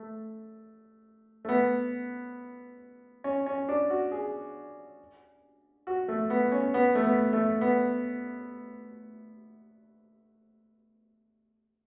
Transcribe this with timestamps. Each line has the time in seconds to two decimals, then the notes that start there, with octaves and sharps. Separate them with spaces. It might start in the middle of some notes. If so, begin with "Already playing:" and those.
Already playing: A3
1.45 A3
1.49 B3
3.24 C#4
3.46 C#4
3.69 D4
3.90 F#4
4.12 G#4
5.87 F#4
6.08 A3
6.30 B3
6.52 C#4
6.74 B3
6.95 A3
7.03 B3
7.33 A3
7.61 B3